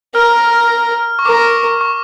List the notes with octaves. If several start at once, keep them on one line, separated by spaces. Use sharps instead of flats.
A#4 F6
C#6
A#4 D6
C#6